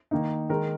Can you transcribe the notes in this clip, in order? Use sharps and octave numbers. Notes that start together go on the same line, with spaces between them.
D#3 A#3 D#4
D#3 G#3 D#4 A#4